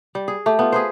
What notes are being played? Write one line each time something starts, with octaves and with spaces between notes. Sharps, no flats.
G3
G#4
A3 G4
B3 F4
G#4 B4 C5